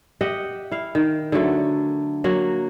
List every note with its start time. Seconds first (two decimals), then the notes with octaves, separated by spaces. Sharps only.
0.21 G4 D#5 E5 F#5
0.71 E4 F5
0.95 D#3
1.32 D3 F#3 A3
2.24 F#3 A#3 F#4